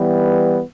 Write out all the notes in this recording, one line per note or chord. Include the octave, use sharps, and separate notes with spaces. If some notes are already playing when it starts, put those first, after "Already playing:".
Already playing: E3 G3 B3